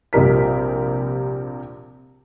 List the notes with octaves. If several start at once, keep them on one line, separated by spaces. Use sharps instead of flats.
A#1 C3 G3 A#4 B6